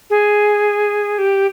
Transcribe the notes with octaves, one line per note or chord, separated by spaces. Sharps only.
G#4
G4